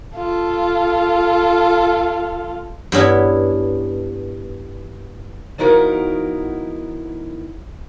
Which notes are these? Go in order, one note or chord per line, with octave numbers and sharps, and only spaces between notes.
F4 A4
G2 B3 C#4 E4
F3 B3 D#4 E4 F#4 A#4